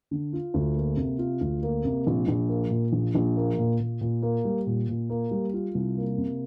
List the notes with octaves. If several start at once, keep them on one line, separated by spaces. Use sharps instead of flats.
D3
F4
D2
A#3
C3
F4
D2
A#3
C3
A#1
A#1
A#3
A#2
A#1
A#1
A#3
A#2
A#2
A#2
A#3
G3
A#2
A#2
A#3
G3
F4
C2
A#3
C3